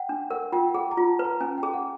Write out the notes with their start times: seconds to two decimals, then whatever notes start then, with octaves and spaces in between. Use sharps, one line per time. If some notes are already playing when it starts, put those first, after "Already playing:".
Already playing: F#5 G5
0.09 D4
0.31 A#4 F#5
0.52 F4 G5
0.69 G5
0.74 G#4 F#5
0.91 A#5
0.98 F4
1.07 A5
1.19 B4
1.24 A#5
1.41 C#4 G#5
1.58 G5
1.63 G#4
1.74 F#5